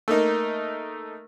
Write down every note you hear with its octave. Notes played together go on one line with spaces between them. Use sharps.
A3 A#3 D#4 A#4